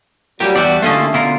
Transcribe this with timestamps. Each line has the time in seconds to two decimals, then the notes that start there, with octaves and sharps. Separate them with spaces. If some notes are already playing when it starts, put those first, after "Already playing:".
0.40 F#3 G3 F4 G4 A#4
0.56 E2 G3 B3 F#4 D5 E5 A5
0.82 D3 A3 A#3 C#4 F4 D#5
1.14 B2 D3 E4 F4 A#4